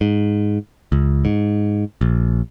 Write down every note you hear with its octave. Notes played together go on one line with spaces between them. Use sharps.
G#2
C#2
G#2
A#1